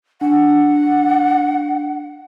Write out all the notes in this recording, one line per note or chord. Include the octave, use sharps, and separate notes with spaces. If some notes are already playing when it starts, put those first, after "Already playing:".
D4 F#5